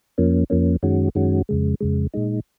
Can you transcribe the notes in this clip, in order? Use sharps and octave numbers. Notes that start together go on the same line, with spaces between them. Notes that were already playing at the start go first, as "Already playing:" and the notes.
F2 F3 A#3 C#4
F2 F3 A#3 C#4
F#2 D#3 G#3 C#4 F#4
F#2 D#3 G#3 C#4 F#4
F2 C#3 G#3
F2 C#3 G#3
A#2 G#3 D#4